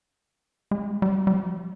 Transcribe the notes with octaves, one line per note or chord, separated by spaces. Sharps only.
G#3
G3
G3
F3